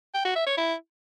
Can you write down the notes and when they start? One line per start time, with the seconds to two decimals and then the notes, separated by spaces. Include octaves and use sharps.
0.14 G5
0.25 F#4
0.36 E5
0.46 C#5
0.57 E4